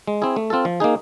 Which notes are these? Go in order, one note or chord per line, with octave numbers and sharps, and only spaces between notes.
G#3
C4 E4 G#4
A3
C4 F4 A4
F3
A#3 D#4 G#4